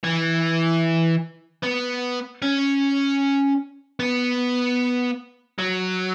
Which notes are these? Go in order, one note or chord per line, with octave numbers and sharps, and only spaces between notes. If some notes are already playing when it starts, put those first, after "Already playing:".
E3
B3
C#4
B3
F#3